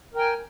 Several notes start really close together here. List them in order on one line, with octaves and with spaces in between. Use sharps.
A#4 G5 G#5